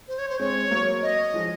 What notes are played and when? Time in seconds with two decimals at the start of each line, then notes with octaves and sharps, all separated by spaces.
0.08 C5
0.19 C#5
0.30 C5
0.39 G#3 C4 C#5
0.71 F#3 A#3
1.02 D#5
1.34 F3 G#3